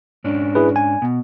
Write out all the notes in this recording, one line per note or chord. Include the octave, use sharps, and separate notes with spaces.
G#2 C#4 D4
E4 G#4 B4
G#5
B2